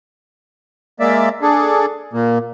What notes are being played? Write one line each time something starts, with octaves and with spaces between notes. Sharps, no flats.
G#3 A#3 D5 E5
D4 G#4 A4
A#2 A#3